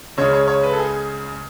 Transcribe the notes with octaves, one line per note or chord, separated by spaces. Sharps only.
C#2 C#3 G#3 C#5
C#5
C#5
B4
A4
G#4